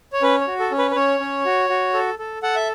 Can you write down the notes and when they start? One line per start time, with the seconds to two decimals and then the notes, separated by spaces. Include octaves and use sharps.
0.13 C#5
0.22 C#4 B4
0.41 C#5
0.47 F#4
0.60 A4
0.71 C#4
0.78 B4
0.91 B4
0.96 C#4 C#5
1.20 C#4
1.45 F#4
1.69 F#4
1.94 A4
2.19 A4
2.43 A4 F#5
2.56 E5